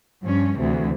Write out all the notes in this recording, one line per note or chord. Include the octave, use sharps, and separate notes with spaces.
G2 F3 C#4
D2 C3 E3